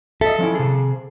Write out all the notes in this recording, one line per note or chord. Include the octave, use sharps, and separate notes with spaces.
A4 D#5 E5
F3 C#4 E4
C3 G#4